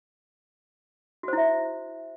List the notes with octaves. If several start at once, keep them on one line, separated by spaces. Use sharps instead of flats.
E4 F#4 C5 E5